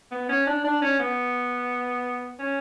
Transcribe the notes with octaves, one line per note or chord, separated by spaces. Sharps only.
B3
C#4
D4
D4
C#4
B3
C#4